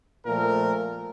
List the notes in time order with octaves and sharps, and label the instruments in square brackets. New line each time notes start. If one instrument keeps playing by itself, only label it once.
[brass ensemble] A#2 F3 A3 A#4